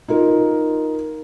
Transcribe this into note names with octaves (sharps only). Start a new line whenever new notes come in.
D#4 F4 A#4